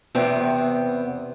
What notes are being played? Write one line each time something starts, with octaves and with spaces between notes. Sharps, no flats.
E2 C3 B3 C4